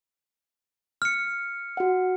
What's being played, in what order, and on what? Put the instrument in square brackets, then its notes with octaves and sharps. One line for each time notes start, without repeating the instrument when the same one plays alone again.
[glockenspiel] F6 C#7
[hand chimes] F#4 F#5